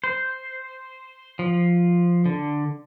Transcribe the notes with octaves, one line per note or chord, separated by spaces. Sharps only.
C5
F3
D3